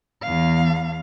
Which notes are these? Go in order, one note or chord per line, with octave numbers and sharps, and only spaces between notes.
E2 F5